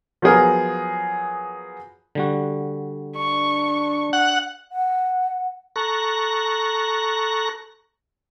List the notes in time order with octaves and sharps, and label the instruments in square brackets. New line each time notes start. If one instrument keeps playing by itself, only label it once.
[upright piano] F3 F#3 B3 G#4 A#4
[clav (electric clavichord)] D3 G3 F#4
[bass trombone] D4 [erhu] C#6
[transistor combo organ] F#5
[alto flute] F#5
[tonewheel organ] A4 A#5 C#6 F#6 A#6